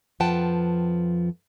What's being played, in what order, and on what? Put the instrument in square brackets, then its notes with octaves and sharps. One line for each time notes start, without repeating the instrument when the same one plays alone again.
[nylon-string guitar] F2 F3 B4 F#5 G5 A5